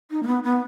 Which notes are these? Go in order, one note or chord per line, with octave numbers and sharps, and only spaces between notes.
D#4
A#3
B3
B3